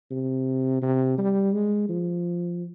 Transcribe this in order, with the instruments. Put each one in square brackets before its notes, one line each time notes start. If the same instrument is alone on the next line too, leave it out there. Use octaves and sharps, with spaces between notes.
[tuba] C3
C3
G3
G#3
F3